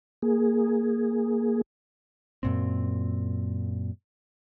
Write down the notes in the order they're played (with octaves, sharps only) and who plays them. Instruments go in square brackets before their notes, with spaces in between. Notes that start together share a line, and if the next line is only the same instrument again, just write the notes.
[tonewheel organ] A#3 G#4
[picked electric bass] F#2 A#2 C4